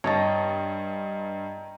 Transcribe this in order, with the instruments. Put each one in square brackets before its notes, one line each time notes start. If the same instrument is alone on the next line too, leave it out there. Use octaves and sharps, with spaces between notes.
[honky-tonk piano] G2 [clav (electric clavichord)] C#5 A5 [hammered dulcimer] D#5 G5 A#5